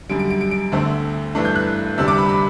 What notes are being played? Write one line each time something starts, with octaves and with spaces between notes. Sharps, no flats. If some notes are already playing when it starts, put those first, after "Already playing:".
F#2 D3 G3 D7
D7
D7
D7
D7
D2 D3 A3 C4
G2 E3 A3 D4
G6
F#6
D2 C3 G3 D4 E6
D6
B5
B5